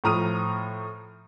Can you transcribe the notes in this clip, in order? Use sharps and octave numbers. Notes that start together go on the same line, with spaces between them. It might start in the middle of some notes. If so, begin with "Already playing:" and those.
A2 F3 A#5 D#6 F6 D#7